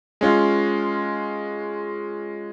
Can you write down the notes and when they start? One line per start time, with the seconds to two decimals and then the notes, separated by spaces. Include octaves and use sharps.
0.21 G#3 C#4 F4